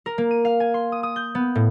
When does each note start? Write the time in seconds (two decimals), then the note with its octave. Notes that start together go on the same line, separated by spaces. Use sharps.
0.06 A#4
0.18 A#3
0.31 D#7
0.45 F5
0.60 G#5
0.74 C6
0.92 D#6
1.03 D#6
1.16 G6
1.35 B3
1.55 A2